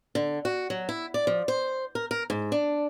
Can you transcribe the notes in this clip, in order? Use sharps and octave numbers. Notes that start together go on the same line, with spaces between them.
D3
F#4
F#3
E4
D5
F3
C5
A#4
A#4
G#2
D4